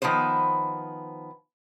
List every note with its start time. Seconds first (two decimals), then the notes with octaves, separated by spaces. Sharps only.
0.02 D#3 F3 B3 B4 C5